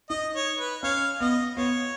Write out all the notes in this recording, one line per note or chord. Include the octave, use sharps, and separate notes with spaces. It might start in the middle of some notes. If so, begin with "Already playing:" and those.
D#4 D#5
C#5
B4
C#4 C#5 F5
B3 D#5
B3 F4 C#5